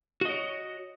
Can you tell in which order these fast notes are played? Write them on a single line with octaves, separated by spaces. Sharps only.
F#4 D#5 C#5